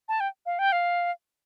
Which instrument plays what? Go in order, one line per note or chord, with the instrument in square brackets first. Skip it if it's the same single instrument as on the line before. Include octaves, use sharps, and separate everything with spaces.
[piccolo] A5
G5
F5
G5
F5